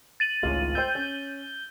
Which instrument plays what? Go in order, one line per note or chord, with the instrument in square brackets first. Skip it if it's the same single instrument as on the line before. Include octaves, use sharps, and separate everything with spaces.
[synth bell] A6 D#7 F#7
[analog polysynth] G#1 C#2 [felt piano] A2 F4
[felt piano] C5 G5 E6 [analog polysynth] G6
[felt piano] C#4